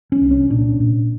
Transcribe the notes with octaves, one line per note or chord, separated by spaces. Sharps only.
C#4
C2
C#4
A#2 D4
A#2